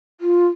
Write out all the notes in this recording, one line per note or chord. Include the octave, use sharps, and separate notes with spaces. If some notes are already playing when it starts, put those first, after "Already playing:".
F4